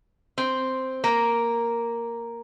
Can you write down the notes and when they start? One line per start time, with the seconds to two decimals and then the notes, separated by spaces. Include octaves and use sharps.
0.38 C4
1.04 A#3